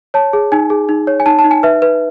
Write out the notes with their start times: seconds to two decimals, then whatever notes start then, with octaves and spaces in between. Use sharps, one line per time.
0.14 C#5 A5
0.33 G#4
0.52 D#4 G#5
0.70 G#4
0.89 D#4
1.07 C#5
1.20 G#5
1.26 D#4 A5
1.39 A5
1.44 D#4
1.51 G#5
1.63 B4 E5
1.82 B4